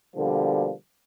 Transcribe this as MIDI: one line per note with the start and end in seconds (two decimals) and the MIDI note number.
0.16 0.72 47
0.16 0.72 50
0.16 0.72 53
0.16 0.72 55
0.16 0.72 58